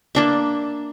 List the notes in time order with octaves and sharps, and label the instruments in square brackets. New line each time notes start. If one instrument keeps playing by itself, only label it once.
[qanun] A#3 D4 E5